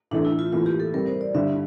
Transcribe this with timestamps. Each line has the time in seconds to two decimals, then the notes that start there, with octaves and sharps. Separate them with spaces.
0.11 A2 E3 A3 D4
0.25 E4
0.39 F4
0.52 A2 E3 A#3 F4
0.66 G4
0.80 A4
0.94 C3 G3 C4 A#4
1.07 C5
1.21 D5
1.34 G2 D3 G3 E5